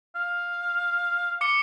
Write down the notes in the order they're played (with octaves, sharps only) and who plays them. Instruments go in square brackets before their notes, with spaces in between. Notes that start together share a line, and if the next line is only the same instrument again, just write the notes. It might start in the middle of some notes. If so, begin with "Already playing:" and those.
[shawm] F5
[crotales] D6 C#7 G7